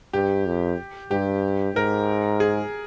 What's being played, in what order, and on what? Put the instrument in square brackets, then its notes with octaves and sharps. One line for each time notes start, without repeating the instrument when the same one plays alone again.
[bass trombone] G2 [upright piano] G4
[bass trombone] F2
[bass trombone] G2 [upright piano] G4
[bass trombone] G#2 [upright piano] A#4
[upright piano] G#4